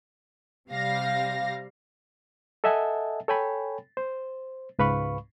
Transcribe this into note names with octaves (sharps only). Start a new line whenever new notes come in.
C3 G3 F5 A#6
A4 D#5 E5 F#5 G#5 A5
A4 C#5 G5 G#5 B5
C5
C#2 G#2 B4 F5 B5 C#6